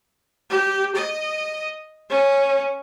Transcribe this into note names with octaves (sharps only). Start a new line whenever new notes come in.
G4
D#5
C#4